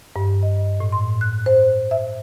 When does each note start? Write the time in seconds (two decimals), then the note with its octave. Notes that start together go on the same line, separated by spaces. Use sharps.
0.16 G2
0.43 D#5
0.80 A2
0.92 C6
1.21 F#6
1.46 C5
1.91 E5